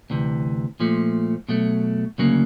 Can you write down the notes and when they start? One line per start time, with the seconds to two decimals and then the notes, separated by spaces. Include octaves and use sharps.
0.10 D2 C3 E3
0.80 A#2 F3 A3
1.49 B2 F#3 A3
2.18 D2 C#3 F#3 A#3